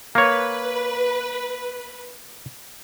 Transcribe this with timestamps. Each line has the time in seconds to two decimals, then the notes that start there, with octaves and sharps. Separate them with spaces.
0.15 A#3 B4 C#5